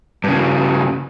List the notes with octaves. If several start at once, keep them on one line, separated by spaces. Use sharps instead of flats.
G2 C#3